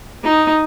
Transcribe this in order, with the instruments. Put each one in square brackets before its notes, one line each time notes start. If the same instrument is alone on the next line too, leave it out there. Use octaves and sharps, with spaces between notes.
[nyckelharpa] D#4